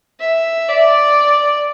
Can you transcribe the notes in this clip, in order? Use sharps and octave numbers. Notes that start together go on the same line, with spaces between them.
E5
D5